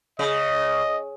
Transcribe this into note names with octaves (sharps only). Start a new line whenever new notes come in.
C#3 D#5